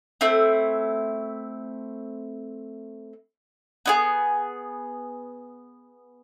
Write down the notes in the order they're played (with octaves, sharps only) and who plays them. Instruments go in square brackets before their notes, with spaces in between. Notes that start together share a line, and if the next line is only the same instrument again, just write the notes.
[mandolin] A3 C4 E4
B3 E4 G#4